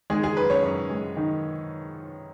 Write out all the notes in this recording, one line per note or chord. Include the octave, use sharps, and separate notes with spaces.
D#3 G#3 G#4
G#4
F#2 B4
C#4 C#5
F#2
G#3
D#3